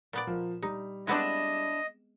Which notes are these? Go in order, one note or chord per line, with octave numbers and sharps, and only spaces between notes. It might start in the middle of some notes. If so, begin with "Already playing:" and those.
A#2 B3 D5
F3 A#4
G3 D#4
G#3 B3 C4 D4 E4 D#5